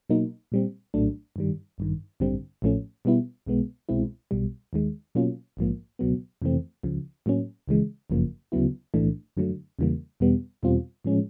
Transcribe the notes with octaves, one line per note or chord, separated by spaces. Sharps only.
B2 F#3 A#3 D#4
A#2 G3 C4
A#1 A2 F#3 A3 D4
G2 D#3 G3
A1 G2 D#3
A1 G2 D3 G3 C4
A1 A2 F3 A3 C#4
B2 G3 B3 E4
B1 B2 G#3 B3
C2 B2 G#3 C4 E4
B1 B2 G3
D#2 D#3 G#3
B2 F#3 A#3 C#4 F4
A#1 G#2 F3 A#3
C#2 B2 F#3 B3
F2 C3 E3 A3 C4
C#2 C#3 F3
A2 F#3 A#3 C#4
C#2 C#3 E3 G#3
G1 F#2 C#3 F3 A#3
D2 C#3 F#3 B3 E4
B1 A2 E3 A3 D4
F#2 D3 F#3 A3
E2 C#3 E3 G3 A#3
E2 B2 G3 B3
E2 B2 G3 C4 F4
A2 F3 G#3 C#4